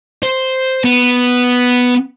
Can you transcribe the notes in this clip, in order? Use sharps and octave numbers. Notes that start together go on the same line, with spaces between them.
C5
B3